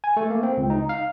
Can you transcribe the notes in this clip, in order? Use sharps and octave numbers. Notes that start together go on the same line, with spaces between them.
G#5
A3
A#3
C4
C#2
D#4
F5